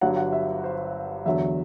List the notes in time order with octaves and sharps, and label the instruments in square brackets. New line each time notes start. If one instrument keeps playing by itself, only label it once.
[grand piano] G1 G2 F#3 F#5
F#5
E5
C5
E2 D3 F#3 E5